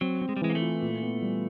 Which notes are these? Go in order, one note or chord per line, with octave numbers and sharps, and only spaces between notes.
F#3 C4
C4
G#3
G3
E3 G#3
A#3
A3
F4
A#2
B3
G3